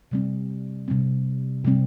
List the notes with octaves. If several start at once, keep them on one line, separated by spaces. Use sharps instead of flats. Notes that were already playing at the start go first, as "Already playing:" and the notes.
C3 G3 C4
C3 G3 C4
C3 G3 C4